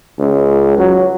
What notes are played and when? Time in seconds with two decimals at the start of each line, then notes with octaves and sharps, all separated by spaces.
0.19 C#2
0.79 F#3